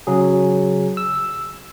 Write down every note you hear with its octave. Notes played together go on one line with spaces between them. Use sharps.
C#3 F#3 G#4
E6